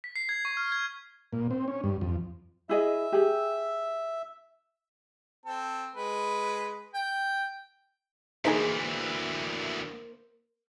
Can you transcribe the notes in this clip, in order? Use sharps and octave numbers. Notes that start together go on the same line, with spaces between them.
B6
C7
G#6
C#6
F6
G#6
A#2
C4
C#4
G2
F2
E4 G#4 D#5 E5
G4 G#4
C4 A4
G#3 B4
G5
D2 E3 A3 A#3 D#4 G#4 A#4 C5